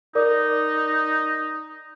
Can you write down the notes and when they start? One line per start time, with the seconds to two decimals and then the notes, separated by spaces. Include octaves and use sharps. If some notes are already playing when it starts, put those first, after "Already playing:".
0.15 D#4 A#4 D5 D6